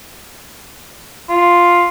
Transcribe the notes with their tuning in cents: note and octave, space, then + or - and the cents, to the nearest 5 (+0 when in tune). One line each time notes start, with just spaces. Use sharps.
F4 +0